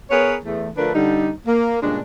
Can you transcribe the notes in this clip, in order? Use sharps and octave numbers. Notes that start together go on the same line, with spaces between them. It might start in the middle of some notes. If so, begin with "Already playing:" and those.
B3 G#4 A#4 B4 C#5
E2 A3
D3 F3 A3 D4 A#4 B4
D3 G3 D#4
A#3
G2 A#2 C#3 G#3 D4